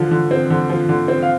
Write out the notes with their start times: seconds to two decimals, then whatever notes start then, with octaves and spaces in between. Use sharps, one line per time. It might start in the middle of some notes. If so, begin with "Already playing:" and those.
Already playing: D3 F3
0.11 D3
0.31 C4
0.50 D3
0.70 F3
0.89 D3
1.08 C4
1.23 F5